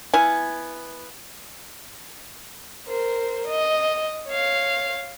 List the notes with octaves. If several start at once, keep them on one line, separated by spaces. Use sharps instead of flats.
B3 E4 F5 G#5
A#4 C5
D#5
C#5 F5